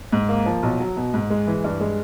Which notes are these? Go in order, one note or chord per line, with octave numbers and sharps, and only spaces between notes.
G#2
A#3
F3
B1
F#3
B2
G#2
G#3
E3
G2
G#3